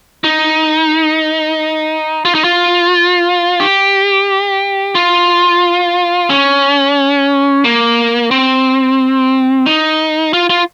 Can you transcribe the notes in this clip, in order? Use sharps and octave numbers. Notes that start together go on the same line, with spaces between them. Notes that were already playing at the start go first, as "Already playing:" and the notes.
D#4
F4
D#4
F4
G4
F4
C#4
A#3
C4
D#4
F4
F4